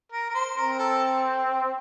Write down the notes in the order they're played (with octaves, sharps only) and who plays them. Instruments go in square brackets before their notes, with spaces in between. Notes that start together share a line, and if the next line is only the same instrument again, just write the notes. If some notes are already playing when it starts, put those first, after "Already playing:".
[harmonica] A#4
A#4
C5
[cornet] C4 [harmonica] A#4
[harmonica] A4